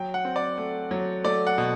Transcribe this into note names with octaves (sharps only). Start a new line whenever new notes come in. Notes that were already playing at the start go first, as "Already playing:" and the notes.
Already playing: F#3 G5
F#5
C4
D5
A3
F#3
A3 D5
F#5
B2